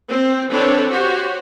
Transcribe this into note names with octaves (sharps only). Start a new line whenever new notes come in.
C4
E3 C4 D4 A4 B4 C#5
F#4 G4 C5 C#5